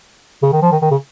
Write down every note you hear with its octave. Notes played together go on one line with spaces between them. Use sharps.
C#3
D#3
F3
D#3
D#3
C#3